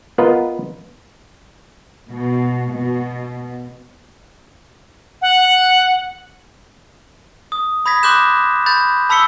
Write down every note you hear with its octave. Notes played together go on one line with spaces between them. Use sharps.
B3 F4 A#4 B4 D#5
B2
B2
F#5
D#6
B5 D#6 G#6 A#6 B6
B5 C6 D6 F#6 G6 E7
B5 G6 A6
A5 B5 E6 B6 C#7 G7